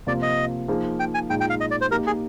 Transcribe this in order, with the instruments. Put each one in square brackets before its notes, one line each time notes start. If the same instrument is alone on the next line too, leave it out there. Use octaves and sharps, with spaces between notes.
[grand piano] C3 F3 A#3 F4 [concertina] D5
[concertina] D#5
[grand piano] F3 A#3 D#4 G#4 C5
[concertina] G5
G#5
[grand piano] A#2 G#3 D#4 [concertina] G5
[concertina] G5
F5
D#5
D5
C5
[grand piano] A#3 D#4 G4 [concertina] A#4
[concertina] G#4